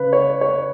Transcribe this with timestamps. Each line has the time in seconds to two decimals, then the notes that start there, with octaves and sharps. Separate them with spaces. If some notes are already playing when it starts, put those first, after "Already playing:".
Already playing: C#3 B4
0.13 C#5
0.41 C#5